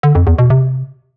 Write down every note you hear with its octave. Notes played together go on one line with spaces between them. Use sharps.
D3
F2
E2
B2
C3